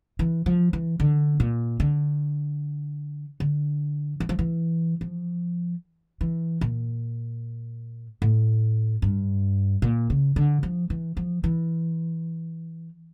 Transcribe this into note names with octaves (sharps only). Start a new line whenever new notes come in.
E3
F3
E3
D3
A#2
D3
D3
E3
F3
E3
F3
E3
A#2
A2
G2
A#2
C#3
D3
F3
E3
F3
E3